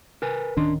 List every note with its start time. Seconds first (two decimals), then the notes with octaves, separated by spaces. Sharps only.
0.22 A#4 B4 G#5
0.57 D1 D#3 C#4 D4 C6